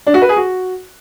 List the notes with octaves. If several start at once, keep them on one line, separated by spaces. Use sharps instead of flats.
D4
F#4
B4
G#4
F#4